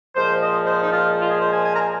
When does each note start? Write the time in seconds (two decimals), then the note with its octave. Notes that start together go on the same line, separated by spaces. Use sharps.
0.16 A#2 F3 G#3 C5
0.41 D#5
0.65 C5
0.80 D#4
0.90 F4
1.22 F4
1.28 G#4
1.39 C5
1.52 G#5
1.64 G#5
1.73 A#5
1.81 G#5